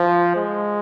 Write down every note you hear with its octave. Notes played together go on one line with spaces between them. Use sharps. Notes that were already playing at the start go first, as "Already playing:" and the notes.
Already playing: F3
G#3